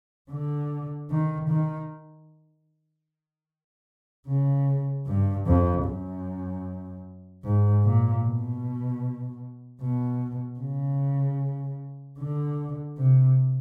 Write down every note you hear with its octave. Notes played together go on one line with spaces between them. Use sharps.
D3
D#3
D#3
C#3
G2
F2
F#2
G#2
A#2
B2
B2
C#3
D3
C3